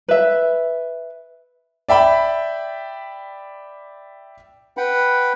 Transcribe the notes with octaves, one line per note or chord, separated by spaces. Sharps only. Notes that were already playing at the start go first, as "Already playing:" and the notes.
B4 E5
D5 E5 G5 B5
B4 F#5 G5 B5